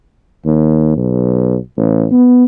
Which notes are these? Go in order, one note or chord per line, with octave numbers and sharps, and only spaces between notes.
D#2
B1
A1
B3